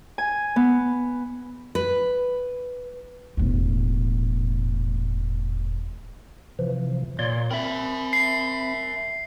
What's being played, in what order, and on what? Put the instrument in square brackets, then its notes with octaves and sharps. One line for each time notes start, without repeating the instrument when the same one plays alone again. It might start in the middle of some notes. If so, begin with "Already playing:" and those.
[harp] G#5
B3
[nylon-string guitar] B4
[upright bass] E1 A2
[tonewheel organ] C3 E3 F3
[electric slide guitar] A#2 [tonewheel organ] C#5 D5 C6
[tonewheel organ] C4 B5 [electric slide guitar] A#4 E5
[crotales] C7